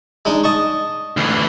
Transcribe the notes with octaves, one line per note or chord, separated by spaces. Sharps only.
G#3 D4 D#4
D#5 A5 C#6
D2 E3